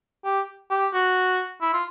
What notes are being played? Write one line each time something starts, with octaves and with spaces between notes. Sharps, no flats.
G4
G4
F#4
E4
F4